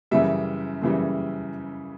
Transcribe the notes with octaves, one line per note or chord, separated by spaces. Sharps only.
F#2 C#3 E3 G3 E5
F#2 C#3 E3 G3